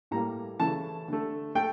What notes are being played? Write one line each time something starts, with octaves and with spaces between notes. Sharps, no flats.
A2 G3 A#3 A#5
C#3 E3 A3 A5
D3 A3
A3 G5